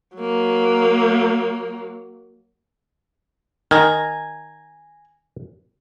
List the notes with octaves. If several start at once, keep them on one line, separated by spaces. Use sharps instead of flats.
F#3 A#3
D#3 G#5 A#5